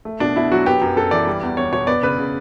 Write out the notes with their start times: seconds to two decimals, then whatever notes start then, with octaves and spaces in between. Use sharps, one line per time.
0.05 A3
0.20 B2 D4
0.36 B2 E4
0.52 F#3 F#4
0.66 B3 G4
0.81 F#2
0.97 F#2 A4
1.11 E3 D5
1.27 G3
1.43 E2
1.57 E2 C#5
1.73 B2 C#5
1.87 B3 D5
2.03 C#3 B4
2.18 C#3